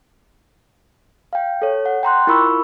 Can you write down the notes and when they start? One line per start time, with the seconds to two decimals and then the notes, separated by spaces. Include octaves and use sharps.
1.33 F5 G5
1.62 A4 C#5
1.86 F#5
2.03 G5 A#5 C6 F#6
2.27 E4 F4 A#4 B5 C#6 E6